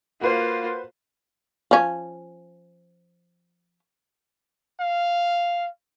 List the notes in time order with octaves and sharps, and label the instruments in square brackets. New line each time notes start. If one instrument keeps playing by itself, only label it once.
[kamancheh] A#3 F4 [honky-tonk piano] F#4 B4 C5
[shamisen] F3 C#4
[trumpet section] F5